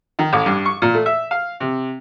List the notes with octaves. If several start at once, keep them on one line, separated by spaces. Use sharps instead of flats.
D#3
A1
G2
C#6
A#2
A3
E5
F5
C3